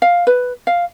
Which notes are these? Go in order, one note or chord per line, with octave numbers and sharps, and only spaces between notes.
F5
B4
F5